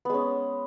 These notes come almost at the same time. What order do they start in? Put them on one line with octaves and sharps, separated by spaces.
B3 G#3 C#4